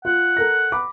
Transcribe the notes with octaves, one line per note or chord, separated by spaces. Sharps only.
F4 F#5
A4 A#4 A#6
B5 D6